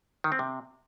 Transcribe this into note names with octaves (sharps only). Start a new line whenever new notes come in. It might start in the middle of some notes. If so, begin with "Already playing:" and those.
D#3
C4
C3